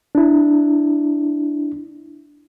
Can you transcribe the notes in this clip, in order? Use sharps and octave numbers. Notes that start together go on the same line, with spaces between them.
D4 E4